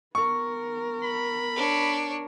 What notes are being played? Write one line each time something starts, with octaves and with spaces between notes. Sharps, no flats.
B3 A#4 C#6
B5
D4 C#5